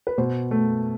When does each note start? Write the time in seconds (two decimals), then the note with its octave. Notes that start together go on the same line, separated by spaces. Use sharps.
0.07 B4
0.18 B2 C5
0.51 A3